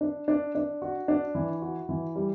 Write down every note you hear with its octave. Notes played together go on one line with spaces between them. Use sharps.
D4
D4
D4
F#4
D4
E3
F#4
E3
G3